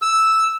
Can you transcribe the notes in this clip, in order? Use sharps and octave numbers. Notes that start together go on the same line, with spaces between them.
E6